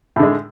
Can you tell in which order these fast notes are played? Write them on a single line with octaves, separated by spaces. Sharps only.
A2 D3 G#3